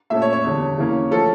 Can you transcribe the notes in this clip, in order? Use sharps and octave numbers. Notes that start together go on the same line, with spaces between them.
A#2 A3 C#4 E5
C#5
C#5
E2 D3 G3
C#3 E3 A#3 C#4
F3 A3 C#4 A4